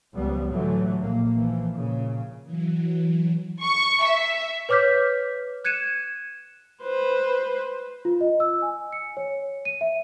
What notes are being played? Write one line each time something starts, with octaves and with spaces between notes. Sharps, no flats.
C#2 F3 G3 B3
A2 D3 E3 F#3 A3
A#1 A#3
E3 F3
A#2 C#3
E3 F#3
C#6
E5
B4 C#5 D6 F6 G6 B6
F#6 G#6 C#7 D#7 E7
B4 C5
F4
D#5
E6
G#5
C#7
C#5
D#7
E5